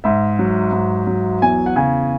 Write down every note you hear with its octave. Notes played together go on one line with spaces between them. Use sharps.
G#2 E5
F#3
G#2
F#3
E2 G#5
F#5
C#3 G#5